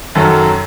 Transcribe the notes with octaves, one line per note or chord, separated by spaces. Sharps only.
F#2 D#3 F#3 A4